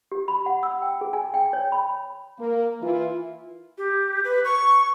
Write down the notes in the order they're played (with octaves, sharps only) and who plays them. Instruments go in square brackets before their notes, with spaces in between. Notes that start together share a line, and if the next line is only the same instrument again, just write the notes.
[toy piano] G4
B5
F#5
E6
G5
G#4
G#5
G5
C#5
B5
[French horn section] A#3
E3 E4 F4
[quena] G4
B4
C#6